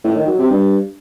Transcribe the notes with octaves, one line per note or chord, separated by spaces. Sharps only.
A2
D#3
F#3
C3
G2